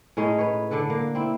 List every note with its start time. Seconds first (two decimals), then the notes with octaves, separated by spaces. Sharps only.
0.17 A2 G#3 C#4 D#4
0.38 B4 C#5
0.71 D3 D4 A4 B4
0.90 A#3
1.15 C4 E4